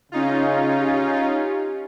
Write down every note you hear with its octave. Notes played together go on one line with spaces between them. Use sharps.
C#3 C#4 D#4 F4
G4